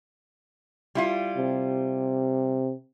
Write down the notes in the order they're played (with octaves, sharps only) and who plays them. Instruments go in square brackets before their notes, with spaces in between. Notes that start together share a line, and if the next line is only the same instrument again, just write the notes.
[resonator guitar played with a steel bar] G3 E4 F4
[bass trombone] C3